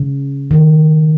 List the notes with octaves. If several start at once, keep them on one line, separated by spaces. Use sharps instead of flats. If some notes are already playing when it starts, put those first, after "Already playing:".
Already playing: C#3
D#3